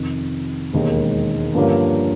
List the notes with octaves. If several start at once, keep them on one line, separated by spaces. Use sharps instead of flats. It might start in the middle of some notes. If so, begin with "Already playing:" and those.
Already playing: F2 C3 D#3
E1 D#2 D#3 G#3
G2 D3 F3 A#3 C#4